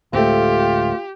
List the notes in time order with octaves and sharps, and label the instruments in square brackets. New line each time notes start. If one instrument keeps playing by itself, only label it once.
[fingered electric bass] D2 A2 G#3 [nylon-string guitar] A3 C4 [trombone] F4 [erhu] G4